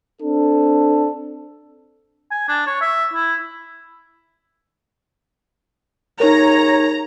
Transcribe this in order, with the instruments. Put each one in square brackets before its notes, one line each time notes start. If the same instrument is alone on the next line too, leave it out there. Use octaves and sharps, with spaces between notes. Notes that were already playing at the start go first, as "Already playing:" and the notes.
[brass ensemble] C4 D4 A4
[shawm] G#5
D4
C#5
E5
E4
[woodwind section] D#2 C#3 C#5 [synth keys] D#4 A#4 [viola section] A#5